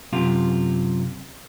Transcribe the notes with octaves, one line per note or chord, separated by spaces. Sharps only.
F#2 C3 F4